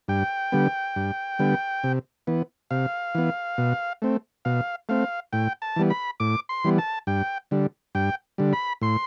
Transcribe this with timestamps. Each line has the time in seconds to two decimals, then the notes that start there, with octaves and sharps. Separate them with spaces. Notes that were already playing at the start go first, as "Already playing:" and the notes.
0.08 G2 G5
0.52 D3 G3 B3
0.96 G2
1.39 D3 G3 B3
1.84 C3
2.27 E3 B3
2.71 C3 F5
3.15 E3 B3
3.58 B2
4.02 A3 C4
4.45 B2 F5
4.89 A3 C4 F5
5.33 A2 G5
5.62 A5
5.76 E3 G3 B3
5.90 B5
6.20 A2 D6
6.49 C6
6.64 E3 G3 B3
6.78 A5
7.07 G2 G5
7.51 D3 G3
7.95 G2 G5
8.38 D3 G3
8.53 B5
8.82 A2 C6